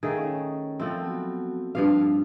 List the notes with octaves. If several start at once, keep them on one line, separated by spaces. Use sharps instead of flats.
D#3 A3 G#4 F5 G#5
C#4 C#5
F3 A3 C4
F#3 B3 F#4
G2 F3 B4 F5 D6